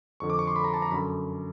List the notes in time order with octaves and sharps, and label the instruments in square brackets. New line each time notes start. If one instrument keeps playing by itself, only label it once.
[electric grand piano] F2 D3 C#6
D6
C#6
C6
B5
A#5
A5
A#5
F#2 D3 B5